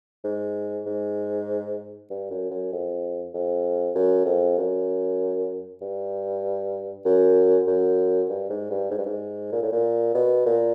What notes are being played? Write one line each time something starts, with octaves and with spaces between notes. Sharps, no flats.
G#2
G#2
G2
F#2
F#2
F2
F2
F#2
F2
F#2
G2
F#2
F#2
G2
G#2
G2
G#2
G2
G#2
A#2
A2
A#2
B2
A#2